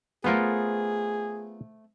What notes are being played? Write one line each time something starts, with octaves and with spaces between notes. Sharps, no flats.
A3 B3 F4 G#4 A#4 C5 F#5